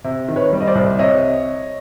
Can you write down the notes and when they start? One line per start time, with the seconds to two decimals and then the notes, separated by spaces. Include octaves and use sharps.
0.04 C3
0.28 D#3
0.36 B4 C#5
0.53 G3
0.61 D#5
0.67 C5 D5
0.75 C2
0.99 C3 C#5 D#5